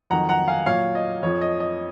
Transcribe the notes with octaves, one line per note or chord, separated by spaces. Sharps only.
F2 D#3 F#3 F#5 A#5
F#5 A#5
F5 G#5
A#2 F#3 C#5 F5
D#5
F2 F3 C#5
D#5
D#5